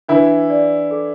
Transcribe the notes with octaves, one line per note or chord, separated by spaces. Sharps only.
E3 D4 E4
D5
A4